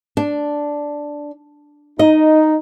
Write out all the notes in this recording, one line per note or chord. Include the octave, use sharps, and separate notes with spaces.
D4
D#4 D#5